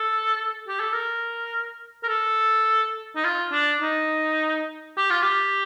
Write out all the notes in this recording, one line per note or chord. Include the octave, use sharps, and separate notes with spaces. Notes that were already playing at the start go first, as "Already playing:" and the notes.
Already playing: A4
G4
A4
A#4
A#4
A4
D#4
F4
D4
D#4
G4
F4
G4